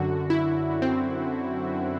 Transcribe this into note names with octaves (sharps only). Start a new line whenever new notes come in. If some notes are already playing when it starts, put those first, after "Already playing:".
Already playing: F#2 D3 F#4
E4
C4